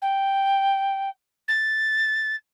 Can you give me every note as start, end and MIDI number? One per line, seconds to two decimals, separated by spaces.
0.01 1.09 79
1.48 2.35 93